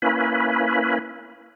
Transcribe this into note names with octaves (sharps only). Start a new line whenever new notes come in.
A#3 C#4 E4 B4